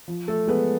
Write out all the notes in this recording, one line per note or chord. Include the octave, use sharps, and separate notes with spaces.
F3
A3 A4
G#3 B3 B4